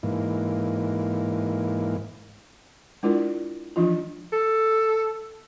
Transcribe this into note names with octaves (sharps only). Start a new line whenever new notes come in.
G#2 E3 A#3
G#3 D4 E4 F4 A#4 D5
E3 F3 D4 D#4 F4
A4